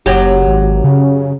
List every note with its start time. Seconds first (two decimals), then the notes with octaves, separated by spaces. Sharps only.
0.06 F#1 F#2 F#3 G4
0.47 G#1
0.84 C#3